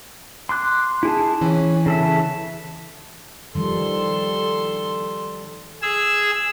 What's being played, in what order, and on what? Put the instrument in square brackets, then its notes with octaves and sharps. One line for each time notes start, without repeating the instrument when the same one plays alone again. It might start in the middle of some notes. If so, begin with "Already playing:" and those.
[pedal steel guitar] C6 D6 F#6
E4 G#4 A5
[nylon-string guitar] E3 [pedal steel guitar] C#4
[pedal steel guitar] C#3 A4 E5
[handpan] D#3 F3 G3 [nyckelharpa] A4 C6
[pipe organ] G#4 E6